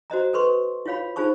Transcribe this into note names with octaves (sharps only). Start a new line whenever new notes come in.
F#4 C5 D#5 A#5
A4 B4 C6 C#6
E4 F4 C#5 F5 B5
D#4 F4 G#4 C5 A5 C#6